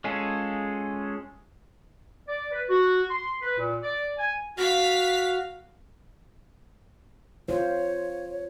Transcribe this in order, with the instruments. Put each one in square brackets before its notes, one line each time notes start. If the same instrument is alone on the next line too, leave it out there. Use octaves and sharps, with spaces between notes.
[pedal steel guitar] G#3 C#4 F4 G#4 A4
[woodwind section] D5
B4
F#4
C6
B4
A#2
D5
G#5
[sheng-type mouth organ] F#4 F6 [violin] F5 B6
[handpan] F4 C5 [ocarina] C#5